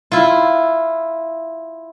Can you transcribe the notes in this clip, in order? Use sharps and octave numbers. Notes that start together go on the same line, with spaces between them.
E4 F4